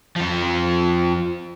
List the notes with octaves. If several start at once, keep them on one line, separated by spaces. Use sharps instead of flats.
F2 F3